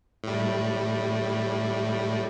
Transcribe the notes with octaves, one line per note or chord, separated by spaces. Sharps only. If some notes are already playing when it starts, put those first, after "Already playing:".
A2 G3